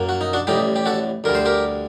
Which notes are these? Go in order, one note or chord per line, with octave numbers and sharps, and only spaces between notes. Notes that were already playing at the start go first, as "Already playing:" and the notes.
Already playing: F#2 F#3 A#3
F#4
D#4
D4 F#4
A1 A2 G3 D#4 G4
G4
F#4 A4
D2 D3 G3 A#4
C5
G4 A#4